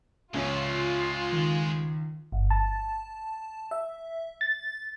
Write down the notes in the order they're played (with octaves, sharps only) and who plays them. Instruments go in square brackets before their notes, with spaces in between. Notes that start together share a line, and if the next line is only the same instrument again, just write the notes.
[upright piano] C#2 C#4 [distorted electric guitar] G#3 E5 [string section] F4
[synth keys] D#3
[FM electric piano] G1
A5
E5
A6